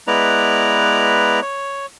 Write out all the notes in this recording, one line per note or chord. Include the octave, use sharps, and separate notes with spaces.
G#3 B3 E4 B4 D5 A#5
C#5